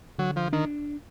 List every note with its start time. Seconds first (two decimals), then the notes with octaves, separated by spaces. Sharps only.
0.18 D3 F#3
0.36 F3
0.53 D#3 D4